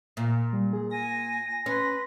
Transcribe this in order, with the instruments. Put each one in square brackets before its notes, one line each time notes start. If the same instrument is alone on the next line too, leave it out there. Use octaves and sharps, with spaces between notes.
[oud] A#2
[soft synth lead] G3
G#4
[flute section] G#5 [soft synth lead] A#6
[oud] C#4 [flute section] B4 C6